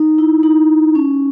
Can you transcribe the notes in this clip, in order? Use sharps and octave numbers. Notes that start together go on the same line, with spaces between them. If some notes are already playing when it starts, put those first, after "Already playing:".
Already playing: D#4
E4
D#4
C#4